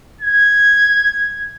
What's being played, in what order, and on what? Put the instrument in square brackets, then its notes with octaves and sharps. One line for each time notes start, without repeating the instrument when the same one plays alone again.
[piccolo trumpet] G#6